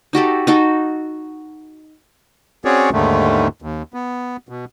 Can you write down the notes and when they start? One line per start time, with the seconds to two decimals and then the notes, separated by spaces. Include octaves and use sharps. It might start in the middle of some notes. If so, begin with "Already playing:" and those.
0.13 D#4 F#4 G4 A4
0.47 D#4 F#4 A4
2.65 C4 C#4 F#4 G#4 C#5 D5
2.93 D#2 G#2 D3 D#3 A3
3.62 D#2
3.94 B3
4.49 B2